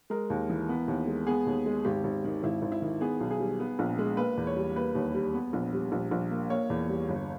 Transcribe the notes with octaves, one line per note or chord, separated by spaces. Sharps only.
G#3 A#4
D#2
E3
B3
D#2
G#3
B3 G#4
D#2
G#3
G#1 G4
G#1
D#3
G#1 E4
G#1
E4
D#3
B3 G#4
B1
G#4
G3
B3
A#1
G#3
A#3 B4
E2
C#5
G3
A#3 B4
D#2
G3
B3
A#1
G3
A#1
A#1
A#3
A#3 C#5
E2
G3
G1